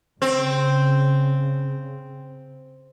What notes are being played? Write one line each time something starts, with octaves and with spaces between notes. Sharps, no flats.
C#3 C4